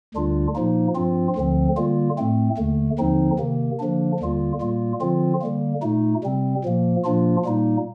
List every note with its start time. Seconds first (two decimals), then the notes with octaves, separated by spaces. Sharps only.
0.15 D2 D3 G3 D4 F4
0.55 A#2 F3 A#3 D#4
0.95 G2 F3 C4 F4
1.36 D2 D3 F3 C4
1.77 D3 G3 A#3 F4
2.18 A2 A3 C4
2.58 D#2 D3 A3
2.99 D#2 D3 F3 C4 D#4
3.39 C3 D#3 A#3
3.80 D3 F3 A#3 D4
4.20 D#2 D3 G3 A#3 F4
4.61 A#2 G3 A#3 F4
5.01 D3 F3 C4 F4
5.41 D3 G3 A#3
5.82 A#2 A3 D#4
6.23 C3 G3 C4
6.64 A#2 F3 A#3
7.04 A#2 F3 A#3 D4 F4
7.45 A#2 G3 A#3 D#4